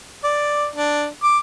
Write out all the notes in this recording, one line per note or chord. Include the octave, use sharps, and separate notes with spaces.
D5
D4
D6